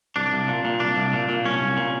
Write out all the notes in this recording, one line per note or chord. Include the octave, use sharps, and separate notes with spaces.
C2 D4
C2
A#2
A#2
C2 D4
C2
A#2
A#2
C2 C#4
C2
A#2